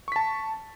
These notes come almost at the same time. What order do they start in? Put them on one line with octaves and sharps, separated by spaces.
C#6 B6 A5